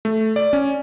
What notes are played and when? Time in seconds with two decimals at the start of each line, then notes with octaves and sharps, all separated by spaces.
0.05 A3
0.36 D5
0.53 C#4